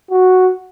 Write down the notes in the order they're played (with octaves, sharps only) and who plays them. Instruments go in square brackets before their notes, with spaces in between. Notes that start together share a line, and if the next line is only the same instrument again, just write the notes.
[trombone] F#4